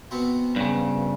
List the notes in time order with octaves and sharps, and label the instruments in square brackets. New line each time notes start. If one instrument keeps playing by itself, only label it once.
[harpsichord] B2 B3 C4
[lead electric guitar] G2 C#3